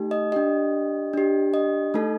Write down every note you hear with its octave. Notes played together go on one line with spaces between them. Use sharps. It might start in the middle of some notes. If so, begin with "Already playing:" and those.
Already playing: A3 D#4 G4
D#5
D4 G4 D#5
D4 G4
D#5
A3 D#4 A4